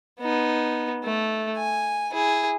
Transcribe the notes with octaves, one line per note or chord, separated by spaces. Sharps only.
B3 D#4
A3
G#5
E4 G#4